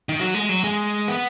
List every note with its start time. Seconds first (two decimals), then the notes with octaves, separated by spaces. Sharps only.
0.09 D#3
0.20 F#3
0.34 G#3
0.49 F#3
0.64 G#3
1.08 B3